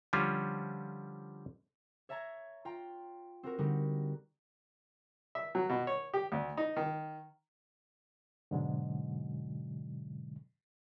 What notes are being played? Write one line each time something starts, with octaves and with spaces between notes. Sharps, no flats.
D3 F3 G3 C#4 F4
C#5 E5 A5 A#5 G#6 A#6
F4 G5 A#5
C4 F#4 A#4
D3 G3 D#4 F#4
E5
F#3
B2
C#5
G4
D2
D#4
D#3
G#2 B2 D3 F#3 G#3